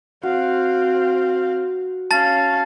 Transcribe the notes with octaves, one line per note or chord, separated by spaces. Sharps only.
C4 F#4 F5
C#4 F5 A5 A6